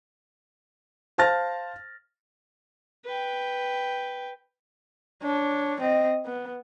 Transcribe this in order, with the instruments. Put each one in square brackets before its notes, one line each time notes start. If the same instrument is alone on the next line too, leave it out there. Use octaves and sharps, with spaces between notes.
[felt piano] C5 F5 A5 F6 A6 A#6
[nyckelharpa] B4 G5
[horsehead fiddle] D4 C#5
C4 D#5
B3